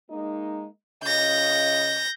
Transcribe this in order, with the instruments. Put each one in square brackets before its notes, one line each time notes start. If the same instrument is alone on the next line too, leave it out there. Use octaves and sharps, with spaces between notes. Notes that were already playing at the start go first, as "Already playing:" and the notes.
[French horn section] G#3 A#3 D#4
[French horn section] C#3 F4 D#5 [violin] G6 A#6